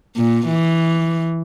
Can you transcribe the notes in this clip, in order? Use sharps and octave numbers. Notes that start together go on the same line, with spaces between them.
A#2
E3